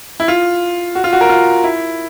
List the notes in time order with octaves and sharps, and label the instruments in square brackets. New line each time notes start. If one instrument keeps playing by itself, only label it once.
[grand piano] E4
F4
F#4
F4
F#4
A#4
F4
E4